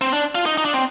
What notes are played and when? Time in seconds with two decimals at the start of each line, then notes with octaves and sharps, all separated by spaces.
0.01 C4
0.13 D4
0.35 F4
0.46 D#4
0.58 D#4
0.65 D4
0.74 C4